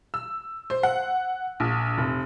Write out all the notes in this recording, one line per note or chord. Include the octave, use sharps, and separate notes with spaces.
E6
C5
F#5
A#1
F1